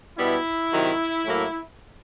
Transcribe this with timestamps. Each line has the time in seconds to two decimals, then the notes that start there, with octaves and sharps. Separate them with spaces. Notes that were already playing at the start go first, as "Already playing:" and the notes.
0.18 B2 G3 B3 E4
0.72 C3 D#3 F#3
1.26 A2 F#3 A#3